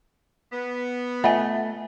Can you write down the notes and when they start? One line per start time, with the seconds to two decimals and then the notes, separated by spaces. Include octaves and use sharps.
0.52 B3
1.24 A3 F4 D#5 E5 F#5 G#5